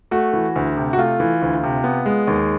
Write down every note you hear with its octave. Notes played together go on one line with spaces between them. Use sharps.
A3 F#4
E3
D2
C3
F#4
A3 F4
E3
D2
C3
B3
G#3
D#2